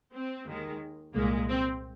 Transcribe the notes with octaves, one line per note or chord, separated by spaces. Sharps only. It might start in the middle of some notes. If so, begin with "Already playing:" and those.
C4
D#2 D#3 G#3
C2 A#2 G#3 A#3
C4